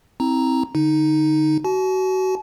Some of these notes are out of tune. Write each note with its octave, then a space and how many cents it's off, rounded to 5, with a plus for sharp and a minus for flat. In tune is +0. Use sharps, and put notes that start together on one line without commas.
C4 +5 E4 -30 A#5 +0
D3 +0 D#4 +0
F#4 +25 A5 -45